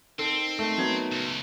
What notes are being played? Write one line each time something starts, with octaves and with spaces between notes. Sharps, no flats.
D#3 C4 A4
A3
F#3 B3 G#6
C#2